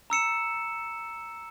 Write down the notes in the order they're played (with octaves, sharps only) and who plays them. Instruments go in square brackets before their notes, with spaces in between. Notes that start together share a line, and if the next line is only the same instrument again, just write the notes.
[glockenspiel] A#5 E6 C#7 E7